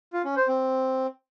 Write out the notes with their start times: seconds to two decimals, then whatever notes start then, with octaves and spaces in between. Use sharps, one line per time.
0.13 F4
0.25 C#4
0.36 C5
0.48 C4